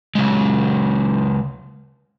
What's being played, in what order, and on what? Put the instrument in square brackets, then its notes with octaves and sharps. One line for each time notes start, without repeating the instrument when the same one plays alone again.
[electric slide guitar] C#3 F#3 G#3